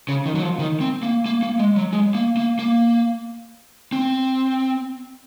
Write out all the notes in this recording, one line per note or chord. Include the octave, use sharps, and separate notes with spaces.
C#3
D#3
F#3
F3
D#3
C4
A#3
A#3
A#3
G#3
F#3
G#3
A#3
A#3
A#3
C4